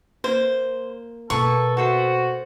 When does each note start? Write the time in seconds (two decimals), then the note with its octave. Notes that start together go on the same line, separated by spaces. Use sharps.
0.24 A#3 C5
1.30 B2 A#3 A4 B4 C#6
1.77 F#4 A4 C5 E5